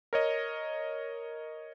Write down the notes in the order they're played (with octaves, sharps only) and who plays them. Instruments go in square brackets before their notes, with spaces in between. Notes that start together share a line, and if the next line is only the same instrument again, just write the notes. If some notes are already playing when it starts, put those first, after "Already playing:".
[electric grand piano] A#4 C#5 D#5